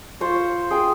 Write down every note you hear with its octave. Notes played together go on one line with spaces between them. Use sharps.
F4 C5 C#6
G#4 G5